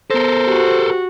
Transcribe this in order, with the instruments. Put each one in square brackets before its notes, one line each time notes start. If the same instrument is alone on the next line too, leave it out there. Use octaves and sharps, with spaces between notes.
[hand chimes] B3 A#6 [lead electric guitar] A4 A#4 [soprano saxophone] C5
[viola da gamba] F#4 [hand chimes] G4